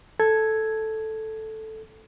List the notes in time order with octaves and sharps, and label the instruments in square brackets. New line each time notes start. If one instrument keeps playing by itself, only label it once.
[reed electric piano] A4 G#6